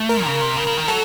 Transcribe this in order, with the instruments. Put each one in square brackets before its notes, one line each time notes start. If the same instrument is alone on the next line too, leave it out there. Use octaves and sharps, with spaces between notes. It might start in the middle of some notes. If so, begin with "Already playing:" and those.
Already playing: [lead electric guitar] A3
[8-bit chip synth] A#4
[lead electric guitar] C#3
C3
C#3
C#3
D#3
[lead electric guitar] F#3 [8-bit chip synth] A4